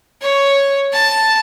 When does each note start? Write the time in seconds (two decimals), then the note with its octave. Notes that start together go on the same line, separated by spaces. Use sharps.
0.21 C#5
0.92 A5